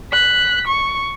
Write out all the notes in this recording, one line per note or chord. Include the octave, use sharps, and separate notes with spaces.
F#6 B6
C#6